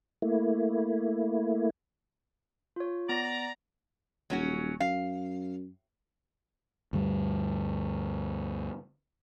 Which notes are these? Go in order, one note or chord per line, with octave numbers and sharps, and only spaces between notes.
A3 A#3 E4
F4 C#5
B3 D5 A#5
D#1 F#3 C#4 F#4
F#2 F5
D2 G2 G3